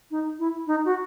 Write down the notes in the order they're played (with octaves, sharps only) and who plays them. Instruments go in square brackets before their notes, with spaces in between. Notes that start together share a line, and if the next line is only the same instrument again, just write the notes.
[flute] D#4
E4
D#4
F#4